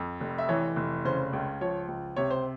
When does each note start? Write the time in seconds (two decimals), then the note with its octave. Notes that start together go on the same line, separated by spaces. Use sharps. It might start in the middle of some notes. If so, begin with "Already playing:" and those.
Already playing: F2
0.21 F1
0.38 E5
0.49 E3 C#5
0.76 F1
1.05 C#3 C5
1.33 C#2
1.61 F3 C#5
1.88 C#2
2.16 C3 C#5
2.31 C5